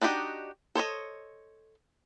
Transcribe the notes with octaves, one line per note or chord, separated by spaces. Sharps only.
D4 D#4 F#4 G4 D#5
A4 C5 C#5 D#5